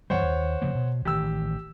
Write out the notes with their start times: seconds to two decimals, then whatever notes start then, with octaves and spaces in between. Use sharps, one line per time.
0.10 F#2 E3 G3 C5 C#5 F#5
0.22 D#2
0.62 C#3 F3 A#3
0.75 B2
1.05 A1 D#3 G4 E6